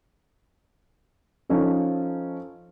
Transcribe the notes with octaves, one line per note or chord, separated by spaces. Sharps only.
F3 C#4 D#4 A4